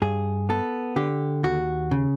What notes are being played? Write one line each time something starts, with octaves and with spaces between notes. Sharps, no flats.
G2 G#4
B3 A4
D3 G4
D#2 F#4
C#3